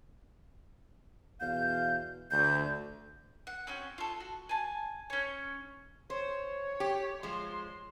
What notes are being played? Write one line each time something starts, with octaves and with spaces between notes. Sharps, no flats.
E2 B2 F5 G6
D2 G6
F#5
C4 C#4 F#4
F4 A4
F#4
G#5 A5
C#4 C#5
C5 C#5
G4
F3 G#3 C6